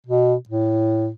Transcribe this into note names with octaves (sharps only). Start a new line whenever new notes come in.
B2
A2